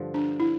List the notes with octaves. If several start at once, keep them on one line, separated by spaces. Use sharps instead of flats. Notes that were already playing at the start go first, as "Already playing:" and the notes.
Already playing: G2 D3 F3
D4
E4